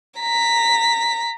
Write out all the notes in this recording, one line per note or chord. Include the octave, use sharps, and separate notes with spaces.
A#5 B6